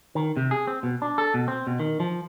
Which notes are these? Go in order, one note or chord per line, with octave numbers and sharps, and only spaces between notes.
D#3
C3
G#4
C4
B2
D4
A4
B2
C4
B2
D#3
F3